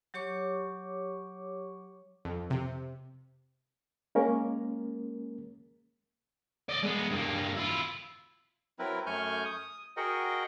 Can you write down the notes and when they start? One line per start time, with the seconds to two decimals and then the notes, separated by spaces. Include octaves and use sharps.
0.14 F#3 G4 C#5 C#6 D6
2.25 F2
2.50 C3
4.15 G#3 A#3 C#4 A#4
6.69 D5 D#5
6.83 G#3 B3
7.11 G2 A#3
7.56 E4 F4
8.79 F#3 C4 E4 A#4 B4
9.06 F#2 A3 G#5 C#6 F6 G6
9.45 D#6
9.97 F#4 G#4 A#4 D#5 F#5 G5